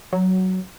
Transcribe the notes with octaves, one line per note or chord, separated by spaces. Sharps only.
F#3